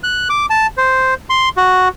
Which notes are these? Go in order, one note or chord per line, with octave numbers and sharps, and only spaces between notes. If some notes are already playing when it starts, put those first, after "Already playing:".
F#6
D6
A5
C5
C6
F#4